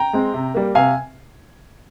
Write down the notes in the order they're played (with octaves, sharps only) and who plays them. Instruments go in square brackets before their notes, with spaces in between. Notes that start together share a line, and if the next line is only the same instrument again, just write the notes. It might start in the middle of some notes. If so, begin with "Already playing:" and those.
Already playing: [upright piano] G5 A#5
G#3 C4
C3
G3 A#3
C3 F5 G#5